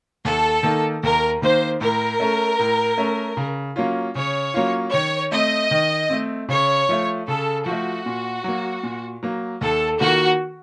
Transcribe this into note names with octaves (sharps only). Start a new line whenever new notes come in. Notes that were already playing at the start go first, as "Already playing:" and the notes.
D#2 A4
D#3 A#3 D#4
D#2 A#4
D#3 A#3 D#4 C5
A2 A#4
A3 C#4 A4
A2
A3 C#4 A4
C#3
F#3 A#3 C#4 F4
C#3 C#5
F#3 A#3 C#4 F4
D#3 C#5
A3 C4 D#5
D#3
A3 C4
C#3 C#5
F3 A3
C#3 A4
F3 F#4
A3
A#2
F#3 A#3
A#2
F#3 A#3
D#2 A4
D#3 A#3 F4 F#4 A#4